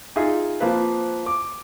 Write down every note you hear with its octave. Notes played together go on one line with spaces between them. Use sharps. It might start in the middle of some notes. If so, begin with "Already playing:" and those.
D#4 F4 G#4 E5
F3 A#3 C4 B4
D6